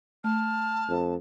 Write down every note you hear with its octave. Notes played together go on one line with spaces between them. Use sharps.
A3 A5 F6
F2